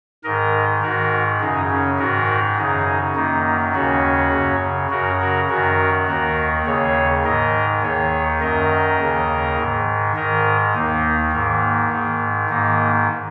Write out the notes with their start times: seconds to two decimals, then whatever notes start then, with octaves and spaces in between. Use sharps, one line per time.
0.24 G#2 D#3 A#4 D#5
0.82 G#2 D#3 F#4 A#4
1.40 F#2 C#3 D#4 G#4
1.70 C#4
1.99 G#2 D#3 F#4 A#4
2.57 F#2 C#3 D#4 G#4
3.15 F#2 D#3 A#3 D#4
3.74 D#2 C#3 C#4 F#4
4.33 F#2 C#3
4.90 F#2 C#3 F#4 A#4
5.20 F#4 A#4
5.49 F#2 D#3 F#4 A#4
6.07 D#2 D#3 F#4 A#4
6.66 D#2 C#3 G#4 C#5
7.24 G#2 D#3 A#4 D#5
7.82 D#2 D#3 G#4 C#5
8.40 F#2 D#3 A#4 D#5
8.99 D#2 C#3
9.57 G#2 D#3
10.16 G#2 D#3 A#4 D#5
10.74 D#2 D#3 A#3 D#4
11.32 G#2 D#3 A#3
11.91 G#2 D#3
12.49 G#2 D#3 A#3 D#4